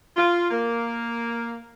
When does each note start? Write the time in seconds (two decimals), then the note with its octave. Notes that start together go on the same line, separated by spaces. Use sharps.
0.17 F4
0.50 A#3